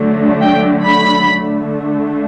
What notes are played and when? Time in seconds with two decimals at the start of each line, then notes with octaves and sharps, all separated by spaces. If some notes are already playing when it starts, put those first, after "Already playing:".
Already playing: D3 F#3 A3
0.42 G5
0.86 B5
1.31 D3 A3